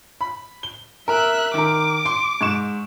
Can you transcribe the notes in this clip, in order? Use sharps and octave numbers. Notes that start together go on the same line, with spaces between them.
B5
G7
A#4 E5 F#6
D#3 A#4 D6
C6
G#2 C#6 E7